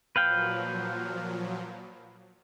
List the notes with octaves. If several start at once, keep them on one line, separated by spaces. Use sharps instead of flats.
A#2 F3 F#3 B4 F5 G5